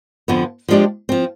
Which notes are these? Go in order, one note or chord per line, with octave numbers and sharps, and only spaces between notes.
F2 D3 F3 B3
F3 G#3 D4 G4 D5
F3 C4